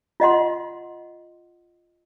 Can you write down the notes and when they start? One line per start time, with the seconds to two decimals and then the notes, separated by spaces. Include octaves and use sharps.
0.20 F4 D#5 F#5 C6